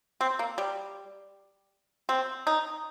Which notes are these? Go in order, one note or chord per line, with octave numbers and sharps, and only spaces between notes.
C4
A#3
G3
C4
D#4